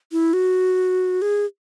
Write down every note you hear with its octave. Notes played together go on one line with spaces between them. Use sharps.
E4
F#4
G#4